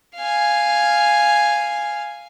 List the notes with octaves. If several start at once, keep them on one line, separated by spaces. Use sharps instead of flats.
F5 G#5